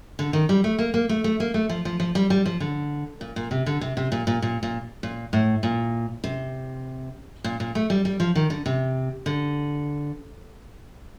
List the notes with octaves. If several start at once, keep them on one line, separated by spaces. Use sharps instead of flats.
D3
D#3
G3
A3
A#3
A#3
A3
A3
A#3
A3
F3
F3
F3
G3
G3
F3
D3
A#2
A#2
C3
D3
C3
C3
A#2
A#2
A#2
A#2
A#2
A2
A#2
C3
A#2
A#2
A3
G3
G3
F3
D#3
D3
C3
D3